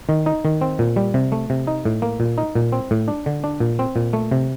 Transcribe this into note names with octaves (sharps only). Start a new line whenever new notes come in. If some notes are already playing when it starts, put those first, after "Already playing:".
D#3
D#4
D#3
C4
A#2
G3
C3
A3
C3
D#4
A2
A#3
A#2
D#4
A#2
C4
A2
D4
D3
D4
A#2
C4
A#2
A3
C3